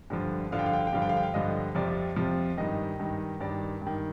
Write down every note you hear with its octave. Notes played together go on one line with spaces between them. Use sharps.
G2 D3 F3
G2 D3 F3 F5
G5
F5
G5
F5
G5
G2 D3 F3 F5
G5
F5
G5
F5
G2 D3 F3 D#5
F2 C3 F3 D5
F2 C3 F3
G2 D#3 D#5
G2 D#3
G2 D#3 D5
G2
D#3